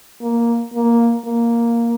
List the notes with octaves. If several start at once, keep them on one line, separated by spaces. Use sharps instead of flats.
A#3
A#3
A#3